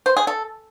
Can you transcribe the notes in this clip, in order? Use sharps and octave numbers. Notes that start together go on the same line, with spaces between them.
C5
G#4
A4